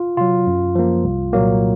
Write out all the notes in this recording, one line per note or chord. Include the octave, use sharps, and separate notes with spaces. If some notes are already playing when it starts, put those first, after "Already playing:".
Already playing: F4
C3 F#3 F4
F#2
F3 A#3
C2
A#2 F#3 A#3